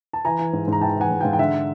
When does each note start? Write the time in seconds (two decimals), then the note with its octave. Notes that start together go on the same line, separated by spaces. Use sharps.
0.13 A5
0.25 E3 G#5 A#5
0.39 E3
0.53 G#2
0.68 G#2 A#5
0.81 E3 G5 A5
0.96 E3 F#5 G#5
1.11 G#2
1.20 F5 G5
1.25 G#2
1.33 G5
1.38 D3 E5 F#5